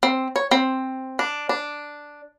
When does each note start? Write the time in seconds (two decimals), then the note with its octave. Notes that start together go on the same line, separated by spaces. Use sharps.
0.03 C4
0.36 C#5
0.51 C4
1.19 D4
1.49 D4